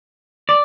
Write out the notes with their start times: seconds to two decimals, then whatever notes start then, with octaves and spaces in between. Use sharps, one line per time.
0.49 D5